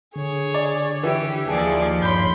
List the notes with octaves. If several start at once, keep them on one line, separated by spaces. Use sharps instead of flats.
D3 G#4 C#5
D5
E3 E4 G4
D#2 F3 G#4 D5 A5
G2 C#5 B5 C6 G6